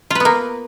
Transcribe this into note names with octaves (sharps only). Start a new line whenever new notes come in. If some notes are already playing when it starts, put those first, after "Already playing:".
A#3 B3 F4 B4